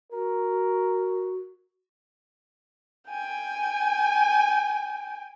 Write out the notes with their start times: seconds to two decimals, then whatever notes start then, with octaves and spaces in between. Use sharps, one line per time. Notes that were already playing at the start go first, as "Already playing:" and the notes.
0.12 F#4 A#4
3.10 G5 G#5